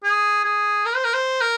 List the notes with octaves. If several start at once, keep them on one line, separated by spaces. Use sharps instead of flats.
G#4
G#4
A#4
C5
A#4
C5
A#4